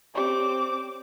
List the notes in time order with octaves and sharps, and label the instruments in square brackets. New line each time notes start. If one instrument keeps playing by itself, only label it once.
[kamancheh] C4 D6 [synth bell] G4 C#5 D5